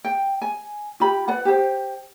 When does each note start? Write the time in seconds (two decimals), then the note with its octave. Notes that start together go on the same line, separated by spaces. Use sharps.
0.05 G5
0.42 G#5
1.00 F4 G4 B5
1.28 B4 D5 F#5
1.45 G4 C5